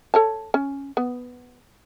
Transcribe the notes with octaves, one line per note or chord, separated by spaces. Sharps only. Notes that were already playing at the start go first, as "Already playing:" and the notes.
A4 C#5 A5
C#4
B3